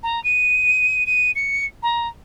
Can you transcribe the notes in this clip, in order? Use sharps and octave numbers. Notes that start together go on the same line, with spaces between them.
A#5
D#7
D#7
C#7
A#5